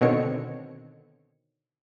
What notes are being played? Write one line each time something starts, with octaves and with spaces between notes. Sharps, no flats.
B2 D3 D#3 C4 C#5 C#7